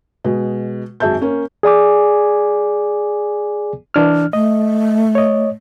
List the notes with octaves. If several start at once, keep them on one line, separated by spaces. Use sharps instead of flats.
B2 G#3
G#1 F#2 G#4 E5 A5 G6
A#3 C#4
G#4 D5 G#5 D6
E3 D4 F6
A3 D#5
C#5 D#5